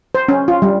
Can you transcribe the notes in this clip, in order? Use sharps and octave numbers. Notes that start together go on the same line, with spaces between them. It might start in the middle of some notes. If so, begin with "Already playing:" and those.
C5
C#4
F4
G3